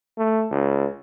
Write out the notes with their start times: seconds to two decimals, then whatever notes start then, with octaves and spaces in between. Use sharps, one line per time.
0.18 A3
0.51 C#2